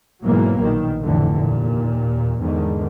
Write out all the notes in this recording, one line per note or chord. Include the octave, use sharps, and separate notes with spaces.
G#2 B2 E3 F#3 A#3
A#1 B2 D#3
F1 D2 A2 D3 E3
D#2 A#2
E2 G#2 D3 D#3